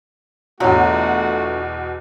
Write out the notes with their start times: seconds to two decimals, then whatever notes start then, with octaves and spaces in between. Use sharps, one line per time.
0.60 E2 B2 D3 F#3 A3 F4 F#4